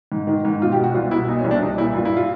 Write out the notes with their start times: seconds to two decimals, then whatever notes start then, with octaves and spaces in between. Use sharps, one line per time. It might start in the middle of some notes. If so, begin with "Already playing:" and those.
0.12 G#2
0.27 D#3
0.45 G#2
0.61 B2 F4
0.72 G4
0.78 B2
0.84 F#4
0.94 C2 F4
1.11 B2 E4
1.28 A#2 D#4
1.39 C#4
1.44 C2
1.51 D4
1.61 C2 D#4
1.78 A#2 E4
1.95 G2 F4
2.05 E4
2.17 F4